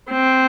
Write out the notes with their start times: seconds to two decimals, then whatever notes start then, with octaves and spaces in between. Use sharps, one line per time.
0.11 C4